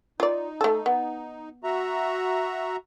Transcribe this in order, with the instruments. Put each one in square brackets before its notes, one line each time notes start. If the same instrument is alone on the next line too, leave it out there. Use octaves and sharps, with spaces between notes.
[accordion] D#4 [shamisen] F4 D5
[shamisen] A3 A4
B3
[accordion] F#4 E5 A#5